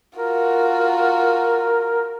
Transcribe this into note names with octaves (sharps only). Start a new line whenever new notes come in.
F4 F#4 A#4